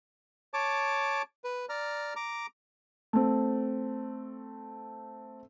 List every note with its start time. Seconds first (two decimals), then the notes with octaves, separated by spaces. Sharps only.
0.54 C#5 A5 D6
1.44 B4
1.69 D5 A#5 F6
2.16 A#5 D6
3.13 A3 C4